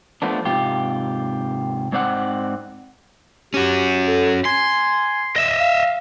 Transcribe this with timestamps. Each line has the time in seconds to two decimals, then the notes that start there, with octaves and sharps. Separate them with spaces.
0.22 F3 A3 B3 D4
0.45 G#2 C3 F4 G4
1.92 G#2 C4 D5 F#5
3.54 C#4 F#4 G4
4.08 A4
4.45 G#5 C6
5.36 D#5 E5
5.60 F5